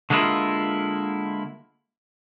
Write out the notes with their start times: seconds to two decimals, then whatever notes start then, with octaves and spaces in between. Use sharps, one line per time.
0.10 D3 G#3 A#3 C#4 E4 F4